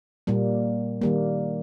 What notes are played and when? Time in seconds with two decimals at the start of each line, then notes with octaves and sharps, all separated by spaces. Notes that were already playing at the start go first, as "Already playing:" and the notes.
0.27 A#2 G3 A#3
1.02 D#3 G3 A#3